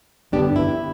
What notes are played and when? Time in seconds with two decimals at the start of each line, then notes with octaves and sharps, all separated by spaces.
0.32 G2 D3 B3 D4 G4
0.56 E4